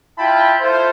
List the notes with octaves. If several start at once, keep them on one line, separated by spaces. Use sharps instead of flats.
E4 F4 G5 A5 B5
E4 F4 A4 C5